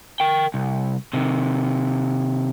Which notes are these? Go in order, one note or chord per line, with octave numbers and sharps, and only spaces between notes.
A#4 G5
C2
C3 D#3